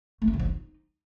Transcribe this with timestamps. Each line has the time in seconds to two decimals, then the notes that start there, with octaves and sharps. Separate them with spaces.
0.22 A3
0.28 C#4
0.33 E3
0.39 F3
0.45 D#4